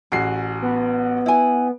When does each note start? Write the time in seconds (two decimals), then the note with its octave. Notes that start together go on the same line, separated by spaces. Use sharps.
0.12 A1 F#4 G#4 C7
0.62 B3
1.26 E4 G#5